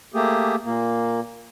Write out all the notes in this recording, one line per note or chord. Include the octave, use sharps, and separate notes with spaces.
A3 A#3 G4 G#4
A#2 A#3